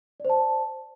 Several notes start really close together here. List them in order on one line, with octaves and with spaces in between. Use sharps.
D5 C5 A5